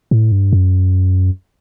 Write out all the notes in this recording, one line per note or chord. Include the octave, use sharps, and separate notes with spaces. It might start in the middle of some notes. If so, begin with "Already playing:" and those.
A2
G2
F#2